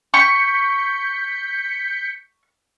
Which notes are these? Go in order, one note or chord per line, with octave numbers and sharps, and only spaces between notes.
C#6 G6 B6 C#7